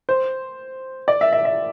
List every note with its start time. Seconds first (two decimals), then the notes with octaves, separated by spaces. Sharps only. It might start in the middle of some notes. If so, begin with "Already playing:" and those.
0.09 C5
1.08 D5
1.21 E5
1.32 E5
1.45 E5